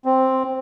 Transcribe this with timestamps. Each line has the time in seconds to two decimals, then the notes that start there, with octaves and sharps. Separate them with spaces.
0.05 C4